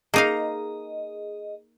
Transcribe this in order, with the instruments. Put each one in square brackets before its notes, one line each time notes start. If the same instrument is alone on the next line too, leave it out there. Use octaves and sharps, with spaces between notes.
[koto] A#3 D#4 F5 [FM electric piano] G#4 D#5